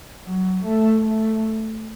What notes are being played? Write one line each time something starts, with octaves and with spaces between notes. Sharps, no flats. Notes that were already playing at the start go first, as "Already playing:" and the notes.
F#3
A3
A3